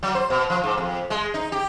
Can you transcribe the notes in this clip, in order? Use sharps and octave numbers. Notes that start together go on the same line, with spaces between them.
F#3
C5
B2
F3
G#2
F2
G#3
D#4
G4